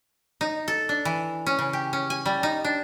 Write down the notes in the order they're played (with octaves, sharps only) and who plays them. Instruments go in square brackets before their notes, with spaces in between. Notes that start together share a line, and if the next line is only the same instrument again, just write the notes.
[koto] D#4
A4
D4
E3
C#4
C#3
G4
C#4
G#5
G3
D#4
D4